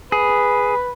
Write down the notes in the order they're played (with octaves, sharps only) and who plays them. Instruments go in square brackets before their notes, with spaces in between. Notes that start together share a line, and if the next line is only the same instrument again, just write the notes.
[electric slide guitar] G#4 [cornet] B4